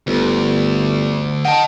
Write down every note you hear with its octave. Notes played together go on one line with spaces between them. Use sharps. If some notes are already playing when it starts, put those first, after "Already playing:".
G1 D2
D#5 F#5 G5 A5